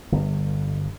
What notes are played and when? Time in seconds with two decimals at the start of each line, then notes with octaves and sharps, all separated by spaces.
0.12 G1